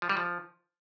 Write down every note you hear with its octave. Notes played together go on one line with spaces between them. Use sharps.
F3
G3
F3